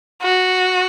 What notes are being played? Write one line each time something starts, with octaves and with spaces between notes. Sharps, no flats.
F#4